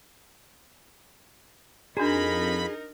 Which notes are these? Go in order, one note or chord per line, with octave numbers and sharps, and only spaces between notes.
F2 D4 D#4 F#4 G#4 A#4 A#5 B5